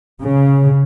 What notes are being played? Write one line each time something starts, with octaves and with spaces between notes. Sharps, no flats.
C#3